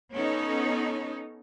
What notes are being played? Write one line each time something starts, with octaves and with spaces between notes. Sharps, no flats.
B3 C#4 D#4 A4 C#5